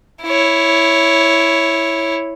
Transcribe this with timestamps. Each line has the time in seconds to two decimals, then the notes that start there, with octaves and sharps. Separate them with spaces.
0.23 E4 C#5